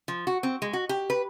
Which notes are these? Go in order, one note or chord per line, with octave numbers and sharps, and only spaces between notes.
F3
F#4
C4
G#3
F#4
G4
B4